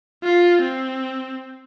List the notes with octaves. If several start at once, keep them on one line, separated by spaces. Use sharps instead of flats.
F4
C4